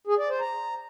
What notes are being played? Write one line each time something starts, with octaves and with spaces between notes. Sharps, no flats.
G#4
D5
C5
A#5